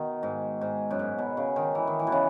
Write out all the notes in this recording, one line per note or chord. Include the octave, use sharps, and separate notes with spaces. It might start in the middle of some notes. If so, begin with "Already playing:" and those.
Already playing: B2 D#3
G#2
G#2
F#2
G#2
B2
C#3
D#3
E3
D#3
E3
B2
C#3